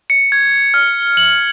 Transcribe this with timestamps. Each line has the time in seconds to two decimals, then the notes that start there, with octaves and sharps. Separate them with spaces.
0.10 C#7
0.32 G#6
0.74 F6
1.17 F#7